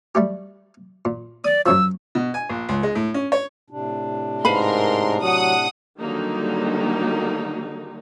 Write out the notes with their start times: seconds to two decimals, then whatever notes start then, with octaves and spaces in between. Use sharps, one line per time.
0.15 G3 A3 G4
1.05 A#2
1.45 D5 D#6
1.66 F#2 C#3 F3 E6
2.15 B2
2.34 G#5
2.49 A#1
2.69 C#2
2.83 G#3
2.95 A2
3.14 C#4
3.32 C#5
3.70 A2 C3 D4
4.45 G#2 A#4 B4 F5 B5 C6
5.23 F#3 F#5 D#6
5.99 D3 D#3 F#3 G3 A#3 D#4